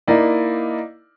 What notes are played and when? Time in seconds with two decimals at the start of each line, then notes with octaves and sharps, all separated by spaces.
0.07 A#3 D#4 E4 D5